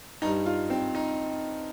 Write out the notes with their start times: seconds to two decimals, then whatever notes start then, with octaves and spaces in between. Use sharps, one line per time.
0.22 G2 G3 D#4
0.46 F4
0.70 C4
0.95 D#4